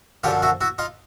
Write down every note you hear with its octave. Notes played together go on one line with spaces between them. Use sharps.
F#2 D3 F3 F4 G4
E4 F#4
E4 F#4
D#4 F4